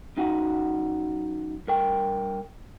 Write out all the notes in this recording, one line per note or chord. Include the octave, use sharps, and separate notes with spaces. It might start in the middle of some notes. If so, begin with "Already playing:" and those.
F#2 D#4 F#4 F#5
G2 A#4 G5